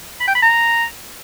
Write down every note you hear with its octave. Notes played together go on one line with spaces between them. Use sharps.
B5
G5
B5
A#5